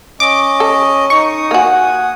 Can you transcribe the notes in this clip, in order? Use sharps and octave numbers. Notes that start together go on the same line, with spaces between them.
C#4 D#5 D6
A4
D#4 C#6 D#6
A#3 F#4 F#5 G#5